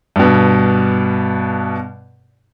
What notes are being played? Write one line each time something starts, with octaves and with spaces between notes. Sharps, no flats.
G2 B2